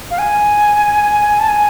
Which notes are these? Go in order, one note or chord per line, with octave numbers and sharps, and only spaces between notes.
F5
G#5
A5
G#5